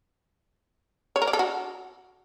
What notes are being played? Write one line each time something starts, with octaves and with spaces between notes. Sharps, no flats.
C#5
A#4
D5
A4
F#4